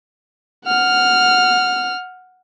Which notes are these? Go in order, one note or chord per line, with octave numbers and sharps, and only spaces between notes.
F#5 F6